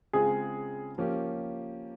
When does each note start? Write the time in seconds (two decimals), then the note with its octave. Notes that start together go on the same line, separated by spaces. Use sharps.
0.13 C#3 G#3 C4 F4 G#4
0.98 F3 A#3 C#4 G4